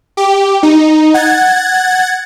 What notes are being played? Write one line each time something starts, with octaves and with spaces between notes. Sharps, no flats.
G4
D#4
F#5 G#6 A6